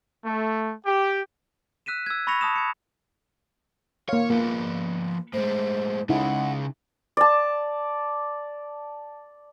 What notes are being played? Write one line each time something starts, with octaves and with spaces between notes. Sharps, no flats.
A3
G4
E6 F#6 B6 D#7 E7
E6 G#6
B5 C#6 A6 A#6 C#7 F7
A5 D#6 E7
G#6 C#7
A#3 C#5 F5
F3 A#3 B3
A2 G#3 C5
C#3 G#3 D#4 E4 F#5
D5 A5